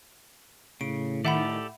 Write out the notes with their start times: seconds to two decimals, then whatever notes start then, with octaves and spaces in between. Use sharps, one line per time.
0.81 A2 C#3 D7
1.25 D#3 G4 A4 D5 E5 F#5 B5